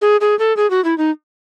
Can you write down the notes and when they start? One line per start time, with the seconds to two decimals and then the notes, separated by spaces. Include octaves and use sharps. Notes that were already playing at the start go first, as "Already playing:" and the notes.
0.02 G#4
0.21 G#4
0.39 A4
0.57 G#4
0.70 F#4
0.84 E4
0.98 D#4